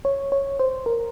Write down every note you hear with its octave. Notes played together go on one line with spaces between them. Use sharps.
C#5
C#5
C5
A#4